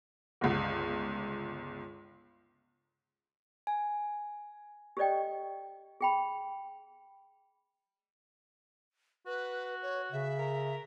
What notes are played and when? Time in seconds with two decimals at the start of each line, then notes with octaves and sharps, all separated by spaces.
0.41 G1 C#2
3.67 G#5
4.97 G4 A4 C5 D5 D#5 G5
6.01 G#4 G5 B5
9.26 F#4 B4
9.82 C#5
10.12 C#3 E5
10.38 A#4